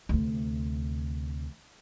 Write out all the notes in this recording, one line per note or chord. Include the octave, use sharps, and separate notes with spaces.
D2 C3